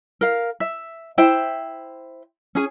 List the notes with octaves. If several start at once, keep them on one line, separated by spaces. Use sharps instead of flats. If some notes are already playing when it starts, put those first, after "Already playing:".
A#4 F5
E5
E4 C5 E5 G5
C#4 G#4